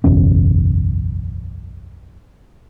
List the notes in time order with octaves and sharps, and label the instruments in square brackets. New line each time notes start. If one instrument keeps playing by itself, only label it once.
[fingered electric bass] F#1 B1 E2 C#4